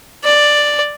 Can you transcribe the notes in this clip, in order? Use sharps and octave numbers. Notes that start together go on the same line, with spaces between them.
D5